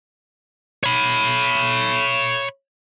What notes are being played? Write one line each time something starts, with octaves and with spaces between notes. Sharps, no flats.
C#5 B5